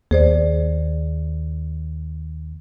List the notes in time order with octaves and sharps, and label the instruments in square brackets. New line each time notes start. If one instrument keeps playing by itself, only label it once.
[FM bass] D#2 [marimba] G#4 C5 D5